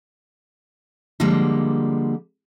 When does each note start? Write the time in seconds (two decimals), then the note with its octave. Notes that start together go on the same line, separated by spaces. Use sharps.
1.20 D3 F3 G3 G#3 A#3